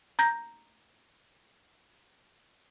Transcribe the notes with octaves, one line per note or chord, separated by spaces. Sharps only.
A#5 G6 A#6